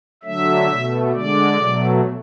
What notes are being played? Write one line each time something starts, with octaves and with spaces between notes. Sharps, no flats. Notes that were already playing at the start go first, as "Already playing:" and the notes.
D3 F#3 A3 E5
B2 A3
D3 G#3 D5
B2 F#3 A3